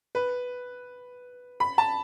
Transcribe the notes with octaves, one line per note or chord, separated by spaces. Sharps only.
B4
B5
A5